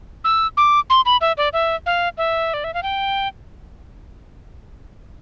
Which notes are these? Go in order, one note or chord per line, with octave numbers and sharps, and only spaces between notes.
E6
D6
C6
B5
E5
D5
E5
F5
E5
D5
E5
F5
G5